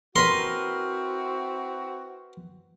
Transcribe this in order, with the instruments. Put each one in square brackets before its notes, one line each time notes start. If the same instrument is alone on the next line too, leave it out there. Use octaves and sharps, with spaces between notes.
[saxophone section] C4 E4 F#4 [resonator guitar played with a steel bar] A#4 B4 [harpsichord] C6